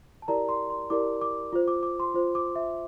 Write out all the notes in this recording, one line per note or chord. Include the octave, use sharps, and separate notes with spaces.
A5
E4 G4 A#4 D5 A#5
C6
C6
E4 G4 A#4 D5 D6
D6
F4 C5
D6
D6
C6
F4 C5
D6
E5